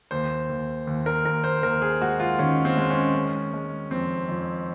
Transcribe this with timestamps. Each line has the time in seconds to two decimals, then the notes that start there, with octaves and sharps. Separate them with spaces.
0.11 D#2 C5
0.50 D#2
0.87 D#2
1.06 A#4
1.25 D#2 A#4
1.44 C5
1.63 D#2 A#4
1.82 G#4
2.01 G#3 F#4
2.20 F4
2.39 D#3 C#4
2.65 C4
2.77 G#3
2.90 C#4
3.15 G#3
3.53 G#3
3.91 F2 C4
4.28 F2